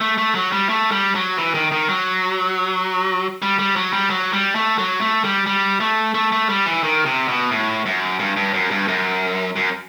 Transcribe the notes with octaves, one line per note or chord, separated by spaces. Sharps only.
A3
A3
F#3
G3
A3
G3
F#3
E3
D#3
D#3
F#3
G3
G3
F#3
G3
F#3
G3
A3
F#3
A3
G3
G3
A3
A3
A3
G3
E3
D#3
C3
B2
A2
F#2
G2
G2
F#2
G2
F#2
F#2